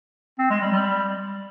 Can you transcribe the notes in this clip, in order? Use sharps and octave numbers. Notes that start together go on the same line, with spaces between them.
C4
G#3
G3
G3